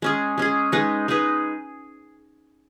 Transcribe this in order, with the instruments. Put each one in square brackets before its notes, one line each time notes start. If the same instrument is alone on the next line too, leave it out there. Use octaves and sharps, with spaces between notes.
[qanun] G#3 C#4 G#4
G#3 C#4 G#4
G#3 D#4 G#4 B4
G#3 D#4 G#4 B4